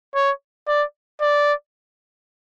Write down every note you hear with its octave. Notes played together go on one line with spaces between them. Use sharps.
C#5
D5
D5